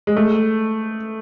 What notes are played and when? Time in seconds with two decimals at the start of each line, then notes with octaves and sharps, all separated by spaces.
0.07 G#3
0.17 A3